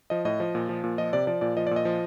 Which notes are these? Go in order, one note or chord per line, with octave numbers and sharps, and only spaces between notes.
F3 D#5
A2 D#5
F3
A#2
F3
A#2
F3 D#5
C3 D5
F3 D5
A#2 D5
F3 D#5
D5
A#2
D#5
F3